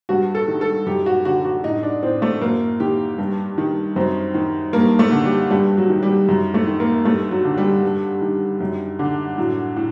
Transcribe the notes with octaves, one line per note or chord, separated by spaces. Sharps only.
G2 F#4
A4
D#3
A4
F#2 G4
F#4
D3 F#4
F#4
A2 D#4
D4
A2 C4
A3
F#2 A#3
D#3 G4
G2
D#3
F#2 C4
D#3
G2 A#3
A3
D3
G3
G2 G3
F#3
D#3
G3
F#2
A3
D#3
A#3
G2 A3
F#3
D3
G3
G2
D#3
F#2
D3
A2 F#3
A2